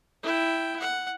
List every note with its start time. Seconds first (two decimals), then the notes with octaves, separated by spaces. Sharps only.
0.23 E4 G5
0.80 F#5